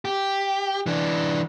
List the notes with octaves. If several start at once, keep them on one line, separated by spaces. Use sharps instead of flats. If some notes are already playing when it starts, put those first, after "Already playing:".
G4
E3 D4